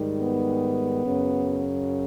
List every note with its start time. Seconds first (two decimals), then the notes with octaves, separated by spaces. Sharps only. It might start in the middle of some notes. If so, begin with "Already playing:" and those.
Already playing: G#2 D#3 G3
0.22 B3
1.04 F#2 C#3 F#3